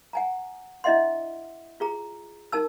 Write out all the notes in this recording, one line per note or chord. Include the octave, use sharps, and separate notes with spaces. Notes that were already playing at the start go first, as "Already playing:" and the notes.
F#5 G#5 A#5
D4 E4 D#5 E5 F#5 C6
F4 G#4 A#5
D#4 A#4 A5 E6